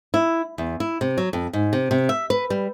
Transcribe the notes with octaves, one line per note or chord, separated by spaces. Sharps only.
E4
E2
E4
C3
F#3
F2
G#2
C3
C3
E5
B4
G3